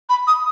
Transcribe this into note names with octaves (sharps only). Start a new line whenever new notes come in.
B5
D#6